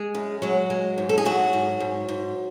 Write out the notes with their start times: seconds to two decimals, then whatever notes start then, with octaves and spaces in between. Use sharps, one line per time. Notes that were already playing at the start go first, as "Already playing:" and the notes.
Already playing: G#3 G#4
0.15 F#2
0.42 F#3 G#3 F#4
0.70 G#3
0.98 G#2
1.09 A4
1.18 G#4
1.25 G#2 F#3 F#4
1.53 G#2
1.80 G#2
2.08 G#2